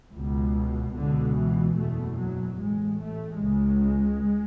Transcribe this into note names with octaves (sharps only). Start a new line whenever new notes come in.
C#2 B2
C#2 B2 D3
E3
F#1 E2 B2 A3
F#3
A1 A2 G#3
A3
C#2 C#3 G#3